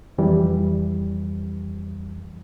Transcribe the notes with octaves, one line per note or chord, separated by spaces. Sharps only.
F2 E3 G3